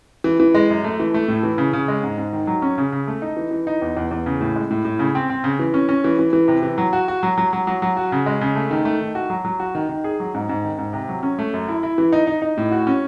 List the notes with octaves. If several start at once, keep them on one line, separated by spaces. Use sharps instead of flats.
E3
E3
G#3
F#2
A3
E3
A3
A2
E3
C#3
C#3
G#3
G#2
G#2
D#3
F#3
C#4
C#3
C#3
A3
D#4
E3
E3
D#4
E2
E2
E2
C#3
A2
G#3
A2
A2
C#3
C4
C4
C#3
E3
C#4
C#4
E3
E3
E3
C3
E3
F#3
F#4
F#4
F#3
F#3
F#3
F#3
F#3
F#4
C#3
G#3
C#3
A3
D#3
A3
D#3
F#4
F#3
F#3
F#4
D#3
D#3
G#4
F#3
G#2
G#2
D#3
G#2
C3
F#3
C#4
A3
F#2
E4
E4
E3
D#4
D#4
D#4
A2
F#4
C#4